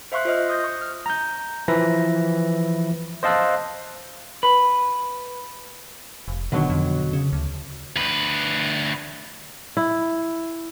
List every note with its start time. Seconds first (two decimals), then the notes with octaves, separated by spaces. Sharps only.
0.12 C5 E5 F5 C6 C#6 F#6
0.25 F4 C5 D#5 F6
0.49 D#6 G6 A#6
0.64 C#6
0.81 F6
1.06 A#5 G6
1.68 E3 F3 B4 E5 A#6
3.23 C5 D#5 F5 A5 E6 F#6
4.43 B4
6.28 F1
6.52 B2 D3 D#3 F#3
6.70 F2
7.13 C#3
7.33 D2
7.96 D2 B4
9.77 E4